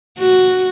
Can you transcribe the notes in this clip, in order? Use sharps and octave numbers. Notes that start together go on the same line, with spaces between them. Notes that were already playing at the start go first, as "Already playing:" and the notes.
F#4